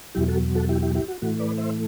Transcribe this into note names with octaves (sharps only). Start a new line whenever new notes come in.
E2 B2 F#3 E4 G4
F#4 A4
F#4 A4
E4 G4
E4 G4
E4 G4
F#4
A2 E3 A3 F#4
B4 D5
C5 E5